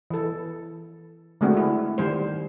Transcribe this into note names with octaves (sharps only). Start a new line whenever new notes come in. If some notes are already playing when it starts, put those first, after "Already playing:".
E3 A4
D3 G#3 A3 C4 F#4
A3 E4
D#3 G3 C5